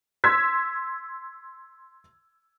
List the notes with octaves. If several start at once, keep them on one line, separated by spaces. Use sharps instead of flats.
C6 E6 G#6 B6